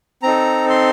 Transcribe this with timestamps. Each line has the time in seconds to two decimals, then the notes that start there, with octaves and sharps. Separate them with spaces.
0.23 C4 D#4 A4 A#5
0.70 C6